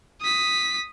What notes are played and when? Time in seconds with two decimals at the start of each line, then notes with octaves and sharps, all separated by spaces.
0.21 D#6 B6